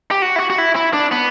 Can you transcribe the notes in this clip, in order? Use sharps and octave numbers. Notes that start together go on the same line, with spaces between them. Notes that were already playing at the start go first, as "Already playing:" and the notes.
G4
F#4
E4
F#4
F#4
E4
E4
D4
B3